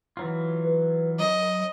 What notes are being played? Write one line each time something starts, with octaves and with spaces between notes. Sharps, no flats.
E3 F#3 F4
B4
F#3 D#5